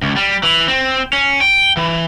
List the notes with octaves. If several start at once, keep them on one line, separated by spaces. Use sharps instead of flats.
C#2
G3
E3
C4
C#4
G5
E3